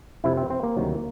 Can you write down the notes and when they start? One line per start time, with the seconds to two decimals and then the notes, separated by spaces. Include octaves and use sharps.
0.24 F2 C3 F3 E4
0.37 C4
0.50 C4
0.63 A#3
0.76 D2 C3 D#3 F#3